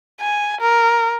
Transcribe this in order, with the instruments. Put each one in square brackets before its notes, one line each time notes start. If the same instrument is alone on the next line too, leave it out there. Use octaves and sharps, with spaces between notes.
[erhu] G#5
A#4